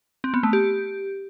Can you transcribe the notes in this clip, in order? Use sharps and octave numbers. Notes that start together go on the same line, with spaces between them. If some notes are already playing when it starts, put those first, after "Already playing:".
C4
B3
A3
G4